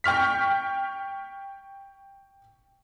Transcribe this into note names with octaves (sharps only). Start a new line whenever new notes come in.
G5 C#6 F6 B6